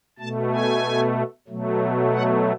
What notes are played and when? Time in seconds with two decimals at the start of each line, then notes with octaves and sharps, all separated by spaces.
0.19 B2 A3 A5
0.52 G#5
1.48 B2 F#3 A3
2.13 F#5